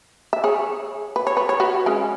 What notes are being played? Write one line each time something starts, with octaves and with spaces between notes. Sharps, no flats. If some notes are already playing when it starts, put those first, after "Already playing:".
E5
G#4 C#5
B4
C#5
B4
C#5
F#4 B4
G#3 C#4